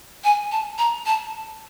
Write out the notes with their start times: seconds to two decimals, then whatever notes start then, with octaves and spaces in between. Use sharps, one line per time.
0.24 G#5
0.52 A5
0.78 A#5
1.06 A5